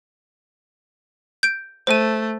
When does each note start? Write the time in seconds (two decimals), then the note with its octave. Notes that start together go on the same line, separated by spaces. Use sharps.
1.43 G6 D7
1.87 A3 C5 D#7